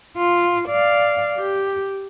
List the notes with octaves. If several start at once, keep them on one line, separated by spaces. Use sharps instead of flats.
F4
D5 F5
G4